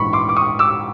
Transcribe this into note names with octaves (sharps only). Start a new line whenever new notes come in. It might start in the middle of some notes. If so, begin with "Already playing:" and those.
Already playing: A#1 G#2 E3 B5 C#6
C6 D6
D6
C#6 D#6
D6 E6